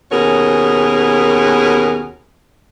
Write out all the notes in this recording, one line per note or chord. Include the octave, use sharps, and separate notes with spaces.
D#2 B2 C#4 F#4 G#4 A#4